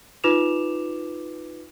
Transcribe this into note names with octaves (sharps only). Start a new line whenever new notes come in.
D#4 F4 B4 D6 E7 F7